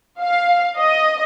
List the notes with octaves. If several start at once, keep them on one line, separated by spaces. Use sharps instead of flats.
F5
D#5